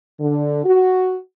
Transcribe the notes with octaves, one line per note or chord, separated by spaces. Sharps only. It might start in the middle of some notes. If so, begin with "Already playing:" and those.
D3
F#4